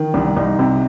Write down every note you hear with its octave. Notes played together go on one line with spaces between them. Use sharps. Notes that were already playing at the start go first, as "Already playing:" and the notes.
Already playing: D#3
C2 D4
C2 D#4
C3